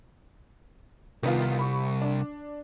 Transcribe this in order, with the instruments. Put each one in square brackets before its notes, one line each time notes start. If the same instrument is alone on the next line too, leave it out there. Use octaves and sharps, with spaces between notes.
[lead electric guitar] C2 [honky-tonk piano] D#3 B3 F4
[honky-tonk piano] B5 C#6
D4